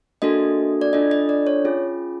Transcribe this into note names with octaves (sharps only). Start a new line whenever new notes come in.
A#3 D4 F#4 A4 D#5
D5
D4 F4 A4 D#5
D#5
D5
C#5
C#4 F4 G#4